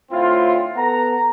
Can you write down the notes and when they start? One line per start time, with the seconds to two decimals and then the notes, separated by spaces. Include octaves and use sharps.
0.11 A2 D3 C4 E4 F4
0.76 B3 A4 F#5 A#5